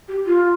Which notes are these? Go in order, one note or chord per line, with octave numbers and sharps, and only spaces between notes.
G4
F4